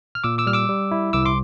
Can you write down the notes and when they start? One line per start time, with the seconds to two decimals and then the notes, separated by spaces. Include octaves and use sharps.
0.15 F6
0.24 A#2 D6 E6
0.38 D6 E6
0.46 G3 F6
0.53 D6 E6
0.69 G3
0.91 E4
1.13 C2 D6 E6
1.25 C6 D6